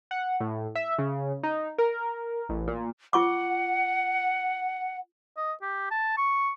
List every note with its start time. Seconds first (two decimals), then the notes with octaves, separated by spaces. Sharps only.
0.11 F#5
0.40 A2
0.75 E5
0.98 C#3
1.43 D#4
1.78 A#4
2.49 A1
2.68 A#2
3.13 F4 F#5 C#6 D6
5.37 D#5
5.62 G4
5.91 A5
6.18 C#6